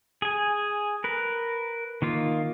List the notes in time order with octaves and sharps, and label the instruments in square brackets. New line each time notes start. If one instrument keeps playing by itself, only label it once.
[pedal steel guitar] G#4 G#5
A#4 B4
D#3 A#3 F4